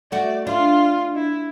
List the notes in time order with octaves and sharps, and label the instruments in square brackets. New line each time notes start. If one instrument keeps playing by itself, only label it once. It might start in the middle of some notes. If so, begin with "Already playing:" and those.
[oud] A3 F#4 [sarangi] D5
[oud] D4 [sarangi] F4
[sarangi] E4